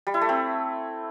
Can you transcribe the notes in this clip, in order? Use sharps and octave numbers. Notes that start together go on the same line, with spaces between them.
G3
E4
A3
C4